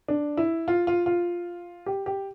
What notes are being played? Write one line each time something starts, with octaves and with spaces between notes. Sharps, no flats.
D4
E4
F4
F4
F4
G4
G4